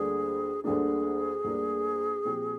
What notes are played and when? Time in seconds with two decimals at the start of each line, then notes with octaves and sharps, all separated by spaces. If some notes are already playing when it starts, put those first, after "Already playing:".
Already playing: D2 D3 G3 A#3 D4 G#4
0.64 D2 D3 G3 A#3 D4 G#4
1.44 D2 D3 G3 A#3 D4
2.25 A#2 F3 C4 G4